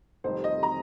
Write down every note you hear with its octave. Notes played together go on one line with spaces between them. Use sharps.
F1 F2 D#3 G3 C5
D#5
A#5